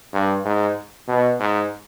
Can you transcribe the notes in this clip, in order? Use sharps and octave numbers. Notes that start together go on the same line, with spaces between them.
G2
G#2
B2
G#2